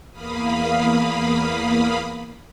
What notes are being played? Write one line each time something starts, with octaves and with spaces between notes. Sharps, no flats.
E2 A#3 F5 B5 D#6